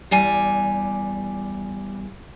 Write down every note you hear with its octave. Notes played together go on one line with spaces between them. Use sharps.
E2 G3 G#5